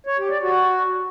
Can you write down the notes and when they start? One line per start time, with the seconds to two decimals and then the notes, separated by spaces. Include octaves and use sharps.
0.07 C#5
0.19 G4
0.30 D5
0.42 F#4